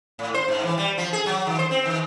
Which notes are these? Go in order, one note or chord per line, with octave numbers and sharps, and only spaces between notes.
A2
C5
G#2
E3
G3
F3
G#4
F#3
D#3
C5
C4
D#3